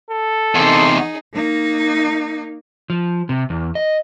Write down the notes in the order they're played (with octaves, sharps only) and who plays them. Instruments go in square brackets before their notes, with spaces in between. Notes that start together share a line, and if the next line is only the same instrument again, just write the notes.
[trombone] A4
[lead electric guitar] E2 C3 [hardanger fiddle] D#4 G#4 [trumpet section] A#4 C6
[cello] A#3 D#4
[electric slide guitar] F3
C3
E2
D#5